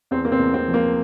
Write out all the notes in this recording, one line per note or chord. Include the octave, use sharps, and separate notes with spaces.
E2 C4
A#3
C4
E2
C4
F3
A#3